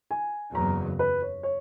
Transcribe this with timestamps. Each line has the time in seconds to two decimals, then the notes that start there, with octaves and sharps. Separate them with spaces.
0.11 G#5
0.55 F#1 E2 C#3 F#3 A#5
0.99 B4
1.22 C#5
1.43 C#5